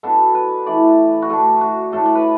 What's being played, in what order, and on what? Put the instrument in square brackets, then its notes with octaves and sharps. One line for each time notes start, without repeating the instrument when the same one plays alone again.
[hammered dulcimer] B2 B3 D4 A4
B4
E3 A3 E4 D5
F#4
D3 A3 D4 A4
F#4
A2 A3 D4 A4
D5
B4